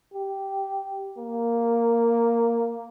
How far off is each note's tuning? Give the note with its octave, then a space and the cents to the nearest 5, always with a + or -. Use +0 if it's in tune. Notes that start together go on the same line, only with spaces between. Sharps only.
G4 -10
A#3 -5